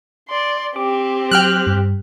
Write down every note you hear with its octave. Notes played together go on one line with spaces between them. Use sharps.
D5 C6
C4 G4 D6
F#3 G5 F6 F#6
G2